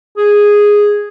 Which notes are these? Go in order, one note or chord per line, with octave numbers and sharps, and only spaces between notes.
G#4